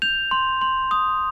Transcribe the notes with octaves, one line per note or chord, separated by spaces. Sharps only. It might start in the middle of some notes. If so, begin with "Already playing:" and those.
G6 F7
C6
C6
D#6